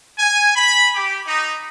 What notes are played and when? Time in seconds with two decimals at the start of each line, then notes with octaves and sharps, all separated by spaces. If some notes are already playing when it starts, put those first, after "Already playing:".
0.18 G#5
0.55 B5
0.95 G4
1.26 D#4